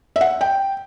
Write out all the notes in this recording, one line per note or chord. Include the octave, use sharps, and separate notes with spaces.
E5
F#5
G5